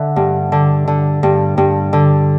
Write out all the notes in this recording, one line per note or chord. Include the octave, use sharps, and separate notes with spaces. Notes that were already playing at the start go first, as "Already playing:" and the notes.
Already playing: D3 E5 F#5
G2
D3
D3
G2
G2
D3